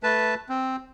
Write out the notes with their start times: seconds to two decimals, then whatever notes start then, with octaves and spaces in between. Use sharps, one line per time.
0.03 A3 B4 A5
0.49 C4